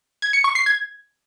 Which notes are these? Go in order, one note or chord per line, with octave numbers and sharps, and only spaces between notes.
G#6
C#7
C#6
C7
G#6